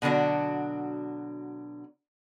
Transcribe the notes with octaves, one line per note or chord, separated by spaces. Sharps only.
B2 D3 F#3 D4 F#4